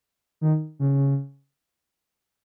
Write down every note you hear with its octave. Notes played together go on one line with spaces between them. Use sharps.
D#3
C#3